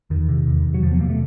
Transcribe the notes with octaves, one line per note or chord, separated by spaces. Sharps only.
E2 D#3
C3
E2
C3
F#3
E2 F3
B3
C3 A#3
A3